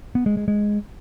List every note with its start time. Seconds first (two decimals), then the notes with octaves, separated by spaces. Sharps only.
0.15 B3
0.26 G#3
0.37 G#3
0.48 G#3